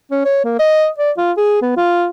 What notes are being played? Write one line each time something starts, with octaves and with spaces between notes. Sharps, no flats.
C#4
C#5
A#3
D#5
D5
F4
G#4
B3
F4